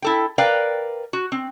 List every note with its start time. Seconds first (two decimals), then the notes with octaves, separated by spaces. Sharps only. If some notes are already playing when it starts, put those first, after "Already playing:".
0.02 E4 A4 G5
0.38 A#4 B4 D5 F5 G5
1.13 F#4
1.32 C4